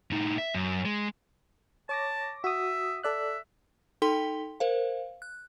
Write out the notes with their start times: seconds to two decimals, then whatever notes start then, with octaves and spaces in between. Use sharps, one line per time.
0.11 A2 D#4
0.38 E5
0.54 F#2
0.85 G#3
1.89 C#5 A5 D6 A#6
2.44 F#4 E5 D#6
3.03 A4 D5 E5 F#6
4.02 D#4 A4 G5 C6 B6 G7
4.60 A#4 C5 F5
5.22 F#6